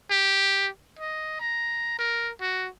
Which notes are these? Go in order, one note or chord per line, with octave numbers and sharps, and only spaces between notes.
G4
D#5
A#5
A#4
F#4